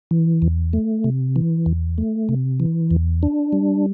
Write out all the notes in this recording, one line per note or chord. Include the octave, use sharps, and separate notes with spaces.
E3
E2
A3
C3
E3
E2
A3
C3
E3
E2
D4
G3